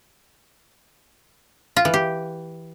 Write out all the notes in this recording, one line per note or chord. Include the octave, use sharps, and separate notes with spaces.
F4
E3
G4